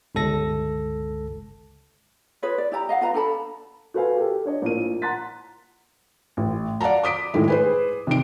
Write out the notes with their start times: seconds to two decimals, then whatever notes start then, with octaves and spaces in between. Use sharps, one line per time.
0.15 G1 C#2 A4 A#6
2.43 F4 G#4 B4 C#5
2.58 D5
2.72 E4 G4 A5 A#5
2.89 D#5 F5 F#5
3.01 F4 B4 A#5
3.14 D4 A4 A5 B5
3.94 F#4 A4 B4 C5 F5 G#5
4.17 G4 A4
4.45 D4 C#5 D#5
4.62 A#1 A2 A#3 D#7
5.02 F#5 A#5 C6 F#6 A6 B6
6.37 A1
6.81 D5 F5 F#5 A5 A#5
7.03 D6 D#6 B6 D7
7.34 A2 D#3 G#3 E4
7.48 G#4 B4 C5
8.07 C3 D#3 D7